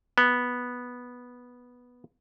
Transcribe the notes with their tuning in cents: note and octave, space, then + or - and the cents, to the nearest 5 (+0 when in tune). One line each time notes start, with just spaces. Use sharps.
B3 -5